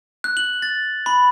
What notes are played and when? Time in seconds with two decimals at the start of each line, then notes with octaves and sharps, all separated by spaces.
0.24 F#6
0.37 F#7
0.62 A6
1.06 B5